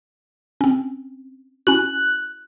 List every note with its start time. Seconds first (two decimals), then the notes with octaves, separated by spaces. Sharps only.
0.61 C4 C#4
1.67 C#4 E4 F#4 F#6